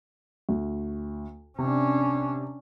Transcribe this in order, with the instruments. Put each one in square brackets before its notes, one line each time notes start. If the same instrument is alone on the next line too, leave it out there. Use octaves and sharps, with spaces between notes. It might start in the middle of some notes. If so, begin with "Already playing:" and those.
[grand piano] D2
[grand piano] C3 [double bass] C#4 D4